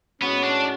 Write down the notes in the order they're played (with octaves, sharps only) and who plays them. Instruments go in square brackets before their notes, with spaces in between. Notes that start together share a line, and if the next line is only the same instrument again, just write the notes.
[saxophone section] A2 G#3 C#4 F#4 C#5 [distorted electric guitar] B3
[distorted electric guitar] D4